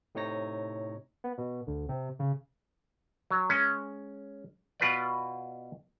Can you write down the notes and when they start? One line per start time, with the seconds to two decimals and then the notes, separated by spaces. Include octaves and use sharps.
0.15 A2 C3 D#4 C#5 A#6
1.24 B3
1.38 B2
1.67 D2
1.89 C3
2.19 C#3
3.31 F#3
3.50 G#3 C#4
4.80 B2 F4 B4 D5